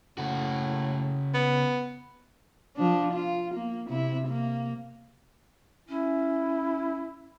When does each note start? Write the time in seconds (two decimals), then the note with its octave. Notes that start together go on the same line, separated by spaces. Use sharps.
0.18 A2 C#3 F#4
1.34 B3
2.76 F3 D4
3.12 F4
3.54 A#3
3.89 C3 E4
4.27 A#3
5.89 C#4 E4